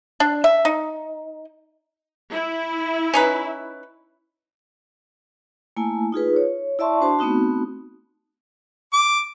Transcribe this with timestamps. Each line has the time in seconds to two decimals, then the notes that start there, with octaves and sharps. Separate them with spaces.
0.20 D4
0.44 E5
0.65 D#4
2.31 E4
3.14 C#4 D#4 B4
5.77 A3 A#3 E4 G#5
6.12 D#4 F4 G#4 B4
6.36 C#5
6.79 E4 D5 E5 A5 C6 C#6
7.01 D4 F#4 C5 A5 C6
7.19 A3 B3 C4 D#4 F#4
8.93 D6